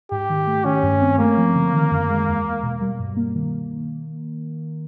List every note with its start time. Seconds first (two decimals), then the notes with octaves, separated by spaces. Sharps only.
0.11 G#2 G4
0.29 D#3
0.47 A3
0.65 D#3 C#4
0.83 G2
1.01 C4
1.19 A3 A#3
1.37 F3
1.55 D3
1.73 D#3
1.91 F#2
2.09 G#3
2.27 E2
2.45 E2
2.63 B2
2.81 G3
2.99 G2
3.17 A#3
3.35 D#3